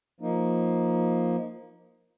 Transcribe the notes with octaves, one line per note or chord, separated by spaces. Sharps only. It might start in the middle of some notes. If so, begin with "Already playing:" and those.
F3 A#3 D#4